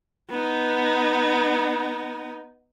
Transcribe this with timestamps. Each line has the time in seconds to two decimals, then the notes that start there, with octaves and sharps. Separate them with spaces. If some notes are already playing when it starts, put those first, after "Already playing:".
0.30 B3 D#4